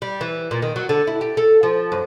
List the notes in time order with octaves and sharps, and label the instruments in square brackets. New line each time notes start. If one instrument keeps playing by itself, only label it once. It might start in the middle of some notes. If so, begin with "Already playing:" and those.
[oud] G3
E3
A#2
D#3
F#3
D3
E4
G4
A4
F3
F#2